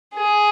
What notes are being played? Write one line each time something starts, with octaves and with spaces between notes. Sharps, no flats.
G#4